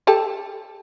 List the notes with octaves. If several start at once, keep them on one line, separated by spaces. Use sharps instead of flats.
G4 A4 A5